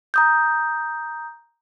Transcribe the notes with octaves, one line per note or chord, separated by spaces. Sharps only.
A#5 D#6 G6